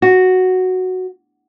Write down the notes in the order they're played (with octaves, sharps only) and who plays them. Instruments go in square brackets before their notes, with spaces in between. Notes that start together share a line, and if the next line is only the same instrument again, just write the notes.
[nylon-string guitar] F#4